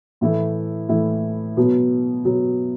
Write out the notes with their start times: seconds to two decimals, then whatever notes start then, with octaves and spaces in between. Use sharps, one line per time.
0.21 A2 E3 A3 E4
0.89 A2 E3 A3 E4
1.57 B2 F#3 B3
2.25 B2 F#3 B3